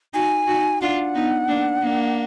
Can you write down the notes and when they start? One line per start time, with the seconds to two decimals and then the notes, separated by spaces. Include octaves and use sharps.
0.13 D#4 F#4 G#5
0.47 D#4 F#4
0.82 D4 F4 F#5
1.14 B3 D#4
1.48 A#3 D4
1.82 A#3 D4